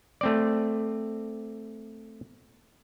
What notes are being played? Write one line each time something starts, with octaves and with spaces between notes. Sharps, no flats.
A3 C4 D5